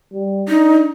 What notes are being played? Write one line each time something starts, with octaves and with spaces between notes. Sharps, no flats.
G3
D4 D#4